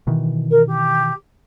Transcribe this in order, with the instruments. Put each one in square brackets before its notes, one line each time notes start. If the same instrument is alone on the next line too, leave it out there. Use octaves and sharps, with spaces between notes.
[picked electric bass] B2 D#3 E3
[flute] A#4
G4